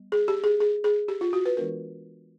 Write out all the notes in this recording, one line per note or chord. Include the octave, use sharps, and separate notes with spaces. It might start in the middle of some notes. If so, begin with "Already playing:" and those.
Already playing: G3 B3
G#4
G4
G#4
G#4
G#4
G4
F4
F#4
B4
E3 G#3 B3 D4 A#4